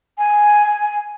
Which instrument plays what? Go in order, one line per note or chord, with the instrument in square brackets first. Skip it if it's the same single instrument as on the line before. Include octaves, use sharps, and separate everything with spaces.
[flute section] G#5